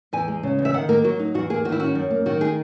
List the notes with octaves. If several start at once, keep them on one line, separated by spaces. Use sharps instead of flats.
E2 G#5
G#3
C#3
E2
E5
D#3 F#5
A#3 A#4
F#3 F#4
D#4
E2 F#4
A#3 G#4
D#3 F#4
E4
C#4 F#4
F#2
A#3
D#3 F#4
D#4 G#4